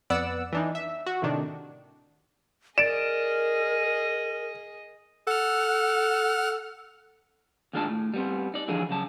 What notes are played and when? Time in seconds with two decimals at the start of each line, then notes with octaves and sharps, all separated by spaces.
0.10 F2 B3 D5 F#5 E6
0.52 E3 D4 D#4
0.75 E5
1.06 F#4
1.22 A2 C3 D#3 D4
2.78 G#4 A#4 D5 D#5 A6 D7 E7
5.27 A4 F#5 F6
7.73 D#2 G#2 G#3 D4 F4 A5
7.87 A2
8.14 G3 B3 C4
8.54 D#4 D5
8.68 D3 E3 F3 D4 G#4
8.89 C#3 F#3 A5